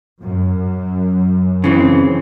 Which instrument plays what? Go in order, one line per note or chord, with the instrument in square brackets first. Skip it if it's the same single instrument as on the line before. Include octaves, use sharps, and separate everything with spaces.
[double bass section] F#2
[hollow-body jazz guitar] C#3 E3 C4